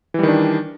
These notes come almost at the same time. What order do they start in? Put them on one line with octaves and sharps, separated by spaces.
E3 G3 D#3 D4